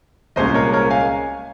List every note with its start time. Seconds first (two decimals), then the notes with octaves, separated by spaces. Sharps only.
0.36 C2 A#2 G#3 C#4 C5 D#5
0.54 A#4 C#5
0.73 A#4 C#5
0.90 F5 G#5